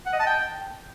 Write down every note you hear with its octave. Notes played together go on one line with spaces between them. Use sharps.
F#5
D#5
A5
G5